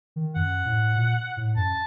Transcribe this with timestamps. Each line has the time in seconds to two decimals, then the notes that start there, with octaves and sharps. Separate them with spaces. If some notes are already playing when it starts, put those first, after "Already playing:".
0.16 D#3
0.35 F#2 F#5
0.66 A2
0.96 A#2
1.37 A2
1.56 F#2 A5